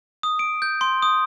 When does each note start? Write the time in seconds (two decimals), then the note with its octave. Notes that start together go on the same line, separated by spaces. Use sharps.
0.23 D#6
0.39 D7
0.62 G6
0.81 C6
1.02 D#6